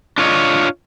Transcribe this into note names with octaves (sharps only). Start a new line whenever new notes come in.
D4 F4 C#5 D#5